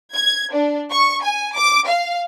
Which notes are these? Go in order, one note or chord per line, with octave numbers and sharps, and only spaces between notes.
G#6
D4
C#6
G#5
D6
F5